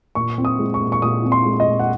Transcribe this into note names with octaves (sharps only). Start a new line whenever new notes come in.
A#2 C#6
C4
D#6
G#3
C#6
A#2
C#6
A#2 D#6
C4
C6
G#3
D#5
A#2
F#5